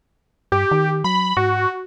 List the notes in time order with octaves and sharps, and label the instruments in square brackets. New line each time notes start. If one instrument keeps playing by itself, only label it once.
[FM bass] G2 [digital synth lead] G4
[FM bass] D#3
[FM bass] F#3 [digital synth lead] B5
[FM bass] G#2 [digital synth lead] F#4